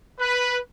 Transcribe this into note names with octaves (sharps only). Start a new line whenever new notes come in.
B4